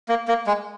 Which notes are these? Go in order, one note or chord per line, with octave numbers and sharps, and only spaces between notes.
A#3
A#3
G#3